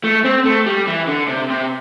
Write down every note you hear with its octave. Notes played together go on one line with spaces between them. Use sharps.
A3
C4
A3
G3
E3
D3
C3
C3